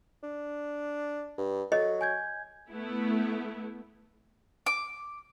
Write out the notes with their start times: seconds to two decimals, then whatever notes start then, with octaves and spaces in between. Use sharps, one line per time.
0.23 D4
1.38 G2
1.72 F#3 A4 D#5
2.01 G#5 G6 G#6
2.69 A3 B3 E4
4.66 D6